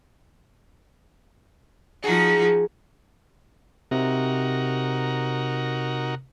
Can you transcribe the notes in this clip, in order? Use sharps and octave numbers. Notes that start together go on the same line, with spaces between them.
F3 D#4 F#4 G#4
C3 D#4 F#4 A#4